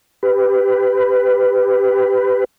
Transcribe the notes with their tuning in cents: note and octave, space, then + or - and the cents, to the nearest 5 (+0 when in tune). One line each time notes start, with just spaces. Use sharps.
G4 +0 B4 +20